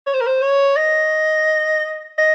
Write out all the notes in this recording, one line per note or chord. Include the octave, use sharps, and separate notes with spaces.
C#5
C5
A#4
C5
C#5
D#5
D#5